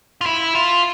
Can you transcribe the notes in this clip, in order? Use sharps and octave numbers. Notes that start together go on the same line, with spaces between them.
F4
E4
F4